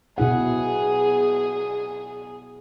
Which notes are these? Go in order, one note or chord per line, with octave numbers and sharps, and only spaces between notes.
B2 E4 G#4 F#5